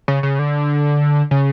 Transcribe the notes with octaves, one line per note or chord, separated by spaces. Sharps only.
C#3
C#3
D3
C#3